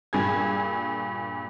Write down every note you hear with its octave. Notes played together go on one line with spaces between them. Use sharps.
G2 A#2 G#4 G#6